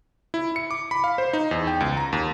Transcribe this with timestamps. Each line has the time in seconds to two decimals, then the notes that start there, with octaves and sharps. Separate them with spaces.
0.34 E4
0.56 C#7
0.71 D6
0.91 B5
1.04 F5
1.18 C5
1.33 D#4
1.51 E2
1.67 G5
1.80 C#2
1.97 A#5
2.13 D#2